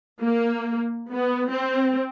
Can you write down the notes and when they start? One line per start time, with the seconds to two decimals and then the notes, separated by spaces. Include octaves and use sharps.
0.20 A#3
1.12 B3
1.49 C4